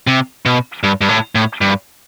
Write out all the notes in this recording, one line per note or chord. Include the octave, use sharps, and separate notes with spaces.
C3
B2
G2
G2
A2
A2
G2